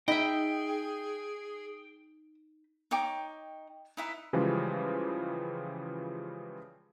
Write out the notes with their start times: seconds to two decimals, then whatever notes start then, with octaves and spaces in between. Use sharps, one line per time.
0.08 D#4 G#4 D#5 E5 G5 B5
2.91 D#4 C#5 G5 D6
3.97 D#4 E4 B4
4.33 C#3 E3 F3 G3 G#3